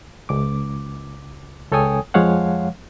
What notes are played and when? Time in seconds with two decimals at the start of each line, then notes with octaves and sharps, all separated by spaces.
0.29 C#2 D6
1.72 C#2 A4 C#5 G5 G#5 D#6
2.14 F2 F3 G#3 C#5 F5 F#5